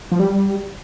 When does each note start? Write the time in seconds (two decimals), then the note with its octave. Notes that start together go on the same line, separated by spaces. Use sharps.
0.12 F3
0.19 G3